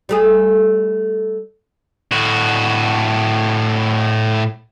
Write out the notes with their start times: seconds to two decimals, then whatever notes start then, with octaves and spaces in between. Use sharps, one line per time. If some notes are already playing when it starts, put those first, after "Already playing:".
0.09 G3 A3 G#4
2.12 A2 F#4